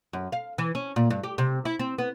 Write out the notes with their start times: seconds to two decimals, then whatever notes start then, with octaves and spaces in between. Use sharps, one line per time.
0.13 F#2
0.32 F5
0.58 E3
0.75 C#4
0.96 A#2
1.10 G2
1.24 G4
1.38 C3
1.65 E4
1.79 C4
1.98 B3